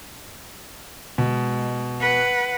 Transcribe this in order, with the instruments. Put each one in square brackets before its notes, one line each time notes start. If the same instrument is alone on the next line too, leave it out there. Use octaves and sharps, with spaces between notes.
[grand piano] B2 [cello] G#3
[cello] B4 F#5